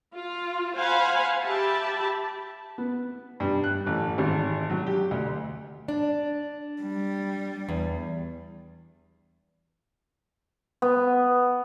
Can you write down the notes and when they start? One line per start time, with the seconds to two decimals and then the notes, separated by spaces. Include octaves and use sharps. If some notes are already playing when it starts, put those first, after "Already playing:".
0.13 F4
0.76 C5 F5 F#5 G#5 B5
1.42 G4 E5 A5 B5
2.78 B3
3.40 G2
3.64 F#6
3.86 A1
4.18 G#1
4.70 F#3
4.86 G4
5.11 D2
5.88 D4
6.82 G3
7.69 E2
10.82 B3